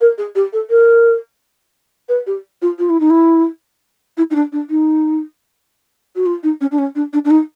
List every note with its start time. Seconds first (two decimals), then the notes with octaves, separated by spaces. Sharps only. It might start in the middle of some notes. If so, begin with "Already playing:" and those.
0.01 A#4
0.18 G#4
0.35 G4
0.53 A4
0.70 A#4
2.09 B4
2.27 G4
2.62 F4
2.79 F4
2.90 E4
3.00 D#4
3.10 E4
4.17 E4
4.31 D#4
4.35 D4
4.52 D4
4.70 D#4
6.16 F#4
6.26 F4
6.43 D#4
6.61 C#4
6.72 D4
6.79 C#4
6.95 D4
7.13 D4
7.25 D4
7.31 D#4